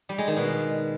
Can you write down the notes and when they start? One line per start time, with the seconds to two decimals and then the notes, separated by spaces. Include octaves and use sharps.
0.09 G3
0.18 G#3
0.28 D#3
0.37 B2